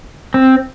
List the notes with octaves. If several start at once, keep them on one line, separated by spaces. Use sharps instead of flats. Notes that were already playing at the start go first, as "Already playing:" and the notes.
C4